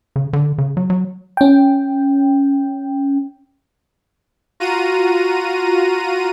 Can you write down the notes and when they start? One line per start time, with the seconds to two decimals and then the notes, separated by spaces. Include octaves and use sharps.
0.16 C#3
0.33 D3
0.58 C#3
0.77 F#3
0.90 F#3
1.37 C#4 G5
4.60 F4 F#4 A#5 D#7